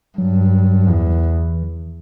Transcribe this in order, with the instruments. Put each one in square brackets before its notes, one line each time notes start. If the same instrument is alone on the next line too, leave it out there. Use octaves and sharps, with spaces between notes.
[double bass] G2 [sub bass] F#3
[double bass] E2 [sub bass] E3